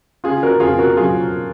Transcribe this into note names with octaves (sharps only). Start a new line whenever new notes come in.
C#3 F4 G#4
F#4 A#4
F2 F4 G#4
F#4 A#4
F#3 F4 G#4